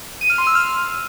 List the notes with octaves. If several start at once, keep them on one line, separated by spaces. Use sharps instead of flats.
D#7
F6
C6
E6
F6